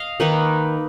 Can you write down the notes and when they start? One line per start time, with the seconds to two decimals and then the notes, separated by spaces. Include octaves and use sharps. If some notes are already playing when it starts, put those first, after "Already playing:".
Already playing: D#5 F5
0.20 D#3 A#3 D#4 B4